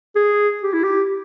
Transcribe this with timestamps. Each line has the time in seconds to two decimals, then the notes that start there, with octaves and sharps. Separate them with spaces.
0.16 G#4
0.63 G4
0.73 E4
0.84 G4